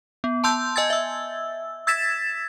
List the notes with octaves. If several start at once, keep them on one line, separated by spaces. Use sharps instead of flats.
B3
A5 C6 E6 G6
D#5 G#5 E6 G#6 A6
E5 E6
E6 G#6 A6 B6 E7